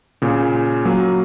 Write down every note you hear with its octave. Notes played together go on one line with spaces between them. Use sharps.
A#2 C#3
F#3 A#3